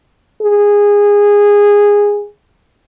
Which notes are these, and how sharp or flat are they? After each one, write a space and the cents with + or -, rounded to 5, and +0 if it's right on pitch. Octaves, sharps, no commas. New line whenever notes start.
G#4 -15